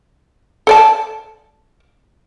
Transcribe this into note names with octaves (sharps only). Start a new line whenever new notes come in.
A4 D5 A5